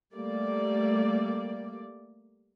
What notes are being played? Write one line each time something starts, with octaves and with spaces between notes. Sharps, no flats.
G3 A3 A#3 D5